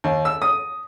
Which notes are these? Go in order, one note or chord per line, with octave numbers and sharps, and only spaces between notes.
D#2
E6
D#6